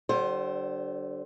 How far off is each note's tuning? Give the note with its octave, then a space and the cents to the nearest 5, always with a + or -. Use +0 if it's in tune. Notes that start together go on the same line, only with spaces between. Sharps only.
D3 +0 G3 -40 C5 +15